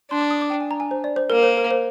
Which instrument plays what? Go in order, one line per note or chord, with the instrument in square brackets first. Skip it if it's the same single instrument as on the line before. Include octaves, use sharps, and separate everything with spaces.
[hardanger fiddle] D4 [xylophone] C6
[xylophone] D6
D#6
D6
G5
G#5
A#5
G#5
C5
D5
C5
[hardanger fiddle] A#3 [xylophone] A#4
[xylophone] C5
A#4
C5